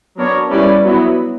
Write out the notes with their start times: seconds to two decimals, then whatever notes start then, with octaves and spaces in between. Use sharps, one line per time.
0.17 F#3 B3 D4 A#4 C#5
0.50 G3 C#4 E4 B4 D5
0.84 F#3 B3 E4